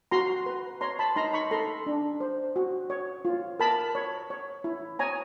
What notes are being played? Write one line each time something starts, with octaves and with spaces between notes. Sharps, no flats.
F#4 A#5 C6
B4
C#5 A#5 C6
A5 B5
D#4 A#5 C6
B5 C#6
A4 A#5 C6
D4
C5
F#4
C#5
F4
A#4 A5 B5
C#5
C#5
E4
C#5 G#5 A#5